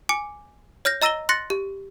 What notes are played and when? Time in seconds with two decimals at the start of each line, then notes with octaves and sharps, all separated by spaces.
0.09 G#5 D6 C#7
0.85 C#5 F6 G6 A#6
1.02 D#5 A#5 E6 A#6 D#7 G7
1.29 C6 F#6 A6 A#6 C#7
1.50 G4